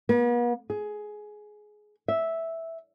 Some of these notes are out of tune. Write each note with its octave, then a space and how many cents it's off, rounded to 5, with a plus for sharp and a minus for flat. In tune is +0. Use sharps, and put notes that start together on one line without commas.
B3 -45
G#4 +15
E5 -5